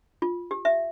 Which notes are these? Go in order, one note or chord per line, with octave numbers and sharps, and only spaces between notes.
F4
G4
E5